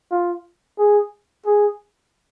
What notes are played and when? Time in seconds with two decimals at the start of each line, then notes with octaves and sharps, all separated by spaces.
0.11 F4
0.78 G#4
1.46 G#4